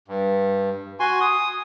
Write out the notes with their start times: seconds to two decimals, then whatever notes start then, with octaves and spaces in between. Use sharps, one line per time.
0.08 G2
1.00 F#4 G#5 C6
1.21 D#6